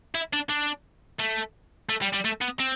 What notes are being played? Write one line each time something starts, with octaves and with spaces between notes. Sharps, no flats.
E4
D4
D4
A3
A3
G3
G3
A3
B3
C4